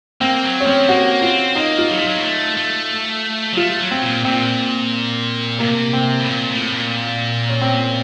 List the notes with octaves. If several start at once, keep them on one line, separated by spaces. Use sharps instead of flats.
A#3 C4
F#3
C#4
F3 C4
A3
A#3 F#4
C4 F4
A#3 D#4
F4
F#3
A3
F#3 F4
A#3
A3
A3
F#3
A3 F4
F#3
C4
A#2
A#2 C4
C3 A#3
C4
A2
A#2
A2
A#2
C#4
C4